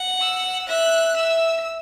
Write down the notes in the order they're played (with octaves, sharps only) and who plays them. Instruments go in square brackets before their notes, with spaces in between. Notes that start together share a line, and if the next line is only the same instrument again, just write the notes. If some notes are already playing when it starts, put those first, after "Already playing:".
Already playing: [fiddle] F#5
[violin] E6
[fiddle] E5 [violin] F#6
[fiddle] E5 [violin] E6